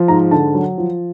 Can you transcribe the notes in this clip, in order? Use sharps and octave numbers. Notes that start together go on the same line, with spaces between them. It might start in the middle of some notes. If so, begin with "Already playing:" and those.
Already playing: F3
G#2 A#5
D3 A5
F#3
F3